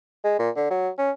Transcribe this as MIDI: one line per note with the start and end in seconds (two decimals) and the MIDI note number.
0.24 0.37 56
0.39 0.50 46
0.56 0.67 50
0.70 0.89 54
0.98 1.11 61